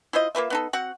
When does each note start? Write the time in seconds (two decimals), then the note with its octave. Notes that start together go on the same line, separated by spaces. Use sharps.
0.13 E4 F4 C5 D#5
0.35 A#3 F4 B4 E5
0.50 B3 D#4 A4
0.73 C4 F#4 F#5